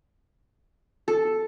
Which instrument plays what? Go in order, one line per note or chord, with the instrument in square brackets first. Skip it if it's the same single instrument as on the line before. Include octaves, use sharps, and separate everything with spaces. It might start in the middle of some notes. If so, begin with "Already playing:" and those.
[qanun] A4